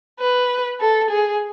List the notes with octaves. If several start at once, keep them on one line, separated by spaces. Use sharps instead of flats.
B4
A4
G#4